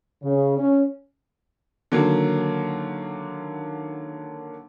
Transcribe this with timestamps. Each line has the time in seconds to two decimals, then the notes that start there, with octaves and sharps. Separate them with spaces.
0.23 C#3
0.58 C#4
1.92 D3 D#3 F#3 A#3